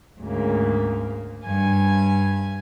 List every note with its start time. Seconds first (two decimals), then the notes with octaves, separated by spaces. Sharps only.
0.20 D2 G#2 C#3 A#3
1.46 G2 G#5 G#6